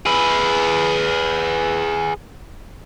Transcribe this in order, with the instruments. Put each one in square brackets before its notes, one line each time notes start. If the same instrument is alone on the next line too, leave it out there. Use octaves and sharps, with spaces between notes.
[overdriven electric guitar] G#4 B4